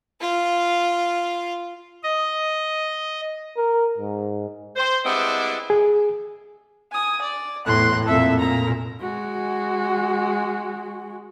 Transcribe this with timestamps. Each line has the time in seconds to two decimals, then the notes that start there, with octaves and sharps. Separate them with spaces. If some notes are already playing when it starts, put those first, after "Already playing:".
0.20 F4 F5
2.04 D#5
3.57 A#4
3.98 G#2
4.76 C5
5.04 G3 G#3 B3 C4 D4 E4
5.70 G#4
6.91 G#5 D#6
7.21 D5
7.66 E2 A2 C6 F#6
8.06 F2 A#2 A4 E5
8.40 A#2 A#5
9.02 G#3 F#4